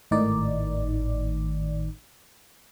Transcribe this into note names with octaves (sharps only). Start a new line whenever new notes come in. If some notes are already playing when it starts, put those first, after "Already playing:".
G#1 A2 D#3 D#4 D5